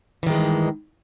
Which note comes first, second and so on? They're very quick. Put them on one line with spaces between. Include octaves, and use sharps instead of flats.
E3 D#3 G#3 G2